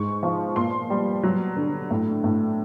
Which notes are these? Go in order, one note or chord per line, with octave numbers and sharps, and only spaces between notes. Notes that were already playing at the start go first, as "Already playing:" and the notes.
Already playing: G#2 C#6
F3
A#2 C6
G3
F#3
D3
A2
A2